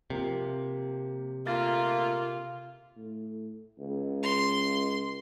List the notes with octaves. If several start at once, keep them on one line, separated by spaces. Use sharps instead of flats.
C3 F3 A#3
A#2 A3 A#3 F4 A6
A2
C#2
C6